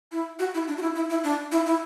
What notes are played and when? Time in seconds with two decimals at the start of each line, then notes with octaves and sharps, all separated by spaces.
0.12 E4
0.39 F#4
0.54 E4
0.67 D4
0.78 F#4
0.82 E4
0.95 E4
1.10 E4
1.24 D4
1.52 E4
1.66 E4